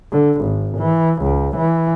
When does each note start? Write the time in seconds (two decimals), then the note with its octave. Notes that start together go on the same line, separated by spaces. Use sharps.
0.12 D3
0.41 G#1
0.78 E3
1.22 C#2
1.56 E3